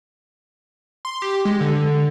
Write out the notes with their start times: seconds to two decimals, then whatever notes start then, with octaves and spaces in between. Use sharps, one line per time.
1.05 C6
1.22 G4
1.45 G#3
1.60 D3